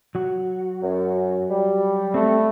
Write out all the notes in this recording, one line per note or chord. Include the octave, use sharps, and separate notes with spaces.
F#3 F#4
F#2
G3
A3 C4 A4